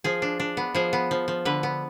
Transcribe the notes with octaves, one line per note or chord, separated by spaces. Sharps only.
F3 G#4
D4
D4
B3
F3 G#4
B3
F3
F3
D3 B4
B3